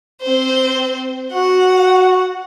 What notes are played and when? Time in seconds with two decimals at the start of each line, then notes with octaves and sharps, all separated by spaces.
0.21 C4 C5
1.33 F#4 F#5